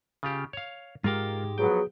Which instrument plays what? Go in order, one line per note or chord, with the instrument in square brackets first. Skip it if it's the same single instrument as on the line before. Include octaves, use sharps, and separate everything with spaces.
[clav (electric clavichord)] C#3 F4 G4
C#5 F5
[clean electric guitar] G#2 G#3 G4 [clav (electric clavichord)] F4 A#4
[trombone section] F3 F#3 B3 [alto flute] G#4 [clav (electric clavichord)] G5